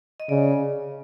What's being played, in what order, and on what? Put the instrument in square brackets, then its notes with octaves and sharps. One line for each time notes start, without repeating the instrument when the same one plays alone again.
[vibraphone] D#5
[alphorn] C#3 [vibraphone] D5